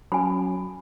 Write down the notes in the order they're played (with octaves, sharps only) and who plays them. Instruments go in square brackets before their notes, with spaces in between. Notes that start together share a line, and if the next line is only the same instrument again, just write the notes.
[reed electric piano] F#3 C#4 [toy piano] G#5 B5